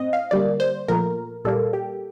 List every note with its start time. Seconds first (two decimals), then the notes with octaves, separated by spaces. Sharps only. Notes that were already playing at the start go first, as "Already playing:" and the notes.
Already playing: A2 C4 D#5
0.13 F5
0.31 D3 G3 A#3 D5
0.60 C5
0.88 A#2 F3 A3 A#4
1.45 A#2 G3 A#3 A4
1.73 G4